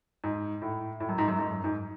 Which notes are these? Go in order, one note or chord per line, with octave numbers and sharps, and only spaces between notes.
G#2
A2
A2
F#2
G#2
F#2
G#2
F#2
G#2